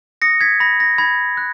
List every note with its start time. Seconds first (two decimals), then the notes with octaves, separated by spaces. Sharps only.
0.22 D#6 A#6 C#7
0.41 G#6 B6
0.60 B5 A#6
0.80 A#6
0.98 B5 G#6
1.37 F#6